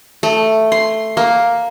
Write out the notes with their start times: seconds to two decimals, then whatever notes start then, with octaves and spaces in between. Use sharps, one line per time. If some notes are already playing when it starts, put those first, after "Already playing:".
0.23 A3
0.72 C6
1.17 A#3